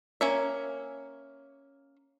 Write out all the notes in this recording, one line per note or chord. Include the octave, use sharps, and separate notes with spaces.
A#3 C#4 E5